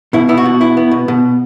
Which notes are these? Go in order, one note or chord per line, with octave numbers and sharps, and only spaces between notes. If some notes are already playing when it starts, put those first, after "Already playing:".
B2 E4
B3 E4
F#4
B2
E4
B3
B2
B2